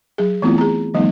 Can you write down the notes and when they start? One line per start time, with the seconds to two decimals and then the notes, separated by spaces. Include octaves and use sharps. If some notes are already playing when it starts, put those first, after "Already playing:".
0.18 F#3 G#4
0.42 E3 A3 B3 C4 E4 F4
0.58 G#4 A#5
0.94 D#3 F3 G3 A3 B3 D#4